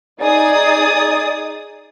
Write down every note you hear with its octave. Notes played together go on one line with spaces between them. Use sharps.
D#4 G#4 D5 D#6 A6